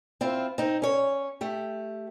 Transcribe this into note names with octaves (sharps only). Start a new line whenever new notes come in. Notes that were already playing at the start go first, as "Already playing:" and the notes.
C4 E4 F4
C4 D#4
C#4 C#5
A3 G4